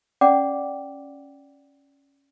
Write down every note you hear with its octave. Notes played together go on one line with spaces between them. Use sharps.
C#4 D5 F#5 G5 D6